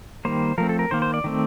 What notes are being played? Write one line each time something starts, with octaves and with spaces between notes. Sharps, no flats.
D#3 G3 A#3 C5
F3 A3 C4 A#4
A4
A#4
D#3 A#3 C5
C5
D5
D#3 A3 C4